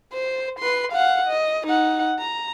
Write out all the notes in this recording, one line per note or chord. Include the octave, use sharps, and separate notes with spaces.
C5
B4 C6
F5 F#5
D#5
D#4 F#5
A#5